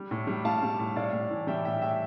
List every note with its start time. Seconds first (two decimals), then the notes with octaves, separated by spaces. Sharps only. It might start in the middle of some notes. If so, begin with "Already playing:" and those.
Already playing: G3
0.11 A2
0.27 G3
0.44 A2 F5 A5
0.62 G3
0.79 A2
0.96 A2 D5 F5
1.13 A2
1.30 E3
1.47 G3 E5 G5
1.65 A2 E5 G5
1.82 A2 E5 G5